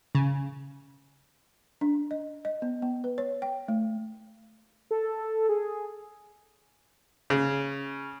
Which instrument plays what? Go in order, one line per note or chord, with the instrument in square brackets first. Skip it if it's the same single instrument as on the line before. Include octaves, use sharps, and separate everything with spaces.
[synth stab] C#3
[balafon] D4
D#5
D#5
B3
B3
B4
C#5
G5
A3
[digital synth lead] A4
G#4
[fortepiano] C#3